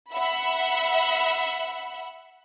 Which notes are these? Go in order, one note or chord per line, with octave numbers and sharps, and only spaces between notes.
E5 F#5 B5